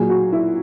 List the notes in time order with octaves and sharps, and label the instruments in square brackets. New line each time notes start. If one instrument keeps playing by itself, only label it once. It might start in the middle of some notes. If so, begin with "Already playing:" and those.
Already playing: [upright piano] A#2 F#3 G#4
F#4
E4